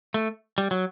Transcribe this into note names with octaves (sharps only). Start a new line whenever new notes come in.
A3
G3
F#3